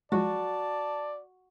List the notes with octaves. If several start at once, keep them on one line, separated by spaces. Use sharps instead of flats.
F3 F#3 G#3 F#4 D5 A5